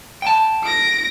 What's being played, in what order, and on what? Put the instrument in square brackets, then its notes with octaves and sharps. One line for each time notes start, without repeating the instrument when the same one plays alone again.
[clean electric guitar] G5 A5
[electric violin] A#6 D7